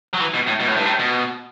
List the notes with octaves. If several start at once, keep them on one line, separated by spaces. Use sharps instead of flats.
F#3
E3
B2
A2
B2
A2
G2
A2
B2